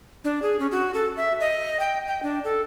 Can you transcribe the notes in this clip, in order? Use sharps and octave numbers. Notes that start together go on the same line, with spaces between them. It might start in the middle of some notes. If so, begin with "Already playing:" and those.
D4
G#4
C#4
F#4
A4
E5
D#5
G5
G5
D4
A4